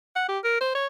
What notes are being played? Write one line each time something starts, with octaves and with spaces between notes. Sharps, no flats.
F#5
G4
A#4
C5
C#5